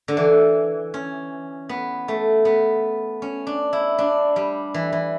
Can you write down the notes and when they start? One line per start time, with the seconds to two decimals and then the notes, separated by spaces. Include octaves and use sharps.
0.08 D3
0.17 E3
0.94 C#4
1.69 B3
2.08 A3
2.45 B3
3.22 C#4
3.47 D4
3.73 E4
3.99 D4
4.36 G3
4.74 E3
4.92 E3